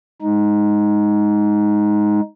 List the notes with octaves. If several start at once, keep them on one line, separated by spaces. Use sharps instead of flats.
G#3 D#4